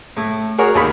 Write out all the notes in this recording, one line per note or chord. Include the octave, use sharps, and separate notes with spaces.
A2
F#4 G#4 A#4 C#5
D#2 D#3 B5